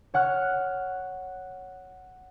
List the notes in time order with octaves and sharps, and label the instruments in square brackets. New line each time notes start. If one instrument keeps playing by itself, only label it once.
[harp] C#5 F#5 F6 F#6